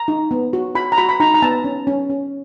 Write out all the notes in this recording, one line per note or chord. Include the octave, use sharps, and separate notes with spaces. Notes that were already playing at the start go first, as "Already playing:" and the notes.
Already playing: A#5
D#4
B3
F#4
F#4 B5
A#5
F#4 B5
B5
D#4 A#5
A#5
B3 A5
C#4
C#4
C#4